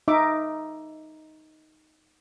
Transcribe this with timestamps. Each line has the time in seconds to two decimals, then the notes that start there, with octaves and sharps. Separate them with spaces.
0.08 D#4 E5 D6